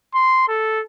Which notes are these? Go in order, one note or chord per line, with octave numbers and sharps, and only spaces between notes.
C6
A4